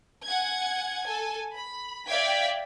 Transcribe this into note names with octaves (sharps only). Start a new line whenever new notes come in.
F#5 G#5 G#6
A4 G#5
B5
D5 E5 F5 G5 G#6 B6